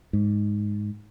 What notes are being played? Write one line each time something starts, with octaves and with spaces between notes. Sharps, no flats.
G#2